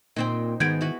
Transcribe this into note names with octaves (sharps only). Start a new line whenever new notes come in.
A#2 C4 D#4 C5 G5
G#2 D#3 B3 F#4 G#4 G6 G#6 D7
E4 F#4 B4